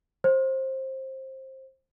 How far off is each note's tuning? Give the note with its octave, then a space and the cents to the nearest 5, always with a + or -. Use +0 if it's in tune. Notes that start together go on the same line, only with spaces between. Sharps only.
C5 +20